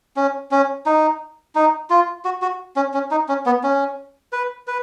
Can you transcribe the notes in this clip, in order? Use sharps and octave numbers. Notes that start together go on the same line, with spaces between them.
C#4
C#4
D#4
D#4
F4
F#4
F#4
C#4
C#4
D#4
C#4
B3
C#4
B4
B4